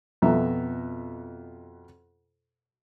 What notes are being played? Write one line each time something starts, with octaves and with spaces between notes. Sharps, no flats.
F2 B2 E5 A#5